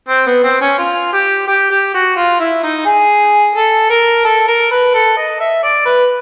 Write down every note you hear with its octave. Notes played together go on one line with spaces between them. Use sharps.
C4
B3
C4
C#4
F4
G4
G4
G4
F#4
F4
E4
D#4
G#4
A4
A#4
A4
A#4
B4
A4
D#5
E5
D5
B4